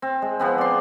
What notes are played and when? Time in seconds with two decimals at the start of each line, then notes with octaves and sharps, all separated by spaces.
0.02 C4
0.22 G#3
0.39 F3 B3 C4
0.58 D5 C6